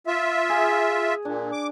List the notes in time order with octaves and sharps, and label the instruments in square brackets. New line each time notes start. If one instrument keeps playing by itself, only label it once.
[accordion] F4 E5
[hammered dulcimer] G#4
[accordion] A#2 [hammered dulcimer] D4
[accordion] D6